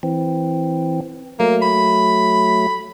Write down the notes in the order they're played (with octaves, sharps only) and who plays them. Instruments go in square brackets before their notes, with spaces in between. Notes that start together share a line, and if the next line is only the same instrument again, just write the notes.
[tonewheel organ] E3 C4
[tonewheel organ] F#3 A3 [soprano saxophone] A#3
[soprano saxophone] B5